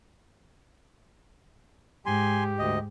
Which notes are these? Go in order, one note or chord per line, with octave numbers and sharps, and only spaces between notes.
G#2 G4 G#5 C6
D2 D#5